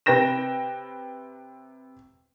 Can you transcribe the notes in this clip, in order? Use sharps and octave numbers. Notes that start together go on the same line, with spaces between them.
C3 B4 G5 A#6 E7